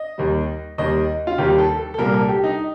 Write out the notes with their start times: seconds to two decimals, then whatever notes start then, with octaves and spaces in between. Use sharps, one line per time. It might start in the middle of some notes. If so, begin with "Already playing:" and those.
Already playing: D#5
0.18 D#2 D#3 G3
0.78 D#2 D#3 G3 D#5
1.27 F4
1.38 D#2 D#3 G3 G4
1.58 A4
1.79 A4
1.94 A4
1.98 C2 A#2 G3 A#4
2.14 A4
2.29 G4
2.44 D#4